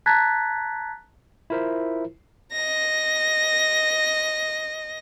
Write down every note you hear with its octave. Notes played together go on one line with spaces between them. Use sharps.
A5 A#5 F#6 G#6 A6 B6
E4 F4 A#4 C5 E5
D#5 A#6